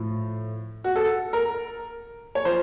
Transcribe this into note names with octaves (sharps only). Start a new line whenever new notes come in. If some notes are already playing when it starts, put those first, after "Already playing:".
Already playing: A2 F3
F#4
A4
A#4
C#5
F3 C5